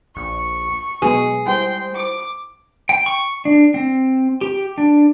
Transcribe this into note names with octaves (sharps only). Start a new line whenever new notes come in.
A#1 C#6
B2 F#3 G#3 B3 G#4
G3 E4 C5 G5 C6
D6
G5
C#6
D4
C4
G4
D4